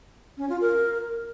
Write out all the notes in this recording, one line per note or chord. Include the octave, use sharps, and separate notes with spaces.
C#4
F4
A#4